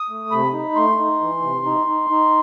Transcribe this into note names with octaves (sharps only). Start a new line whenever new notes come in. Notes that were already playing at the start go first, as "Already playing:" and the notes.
Already playing: D#6
A3
C3 B5
D#4
A3 C6
D#4
E3
C3
D#4
D#4
D#4